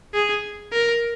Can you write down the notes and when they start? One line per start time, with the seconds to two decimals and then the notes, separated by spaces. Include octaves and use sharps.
0.14 G#4
0.72 A#4